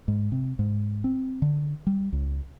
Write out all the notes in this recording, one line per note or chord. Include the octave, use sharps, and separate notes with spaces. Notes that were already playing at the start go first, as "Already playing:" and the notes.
G#2
C3
G#2
C4
D3
G3
C#2